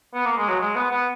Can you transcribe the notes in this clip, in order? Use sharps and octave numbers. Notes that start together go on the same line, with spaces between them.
B3
A#3
G#3
F#3
G#3
B3
B3